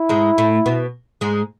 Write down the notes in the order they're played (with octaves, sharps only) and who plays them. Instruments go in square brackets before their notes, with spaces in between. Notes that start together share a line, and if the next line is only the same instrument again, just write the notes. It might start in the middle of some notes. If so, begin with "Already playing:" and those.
Already playing: [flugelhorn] E4
[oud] G#2 G#3
A2 A3
B2 B3
G#2 G#3